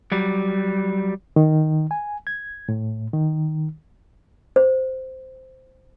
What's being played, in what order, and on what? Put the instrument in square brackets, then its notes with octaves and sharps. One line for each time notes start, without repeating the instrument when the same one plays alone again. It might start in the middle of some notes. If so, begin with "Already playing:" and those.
[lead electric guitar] F#3 G3
[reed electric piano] D#3
G#5
G#6
A2
D#3
[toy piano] C5